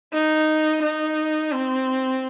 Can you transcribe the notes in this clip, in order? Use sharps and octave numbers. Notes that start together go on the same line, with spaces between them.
D#4
D#4
C4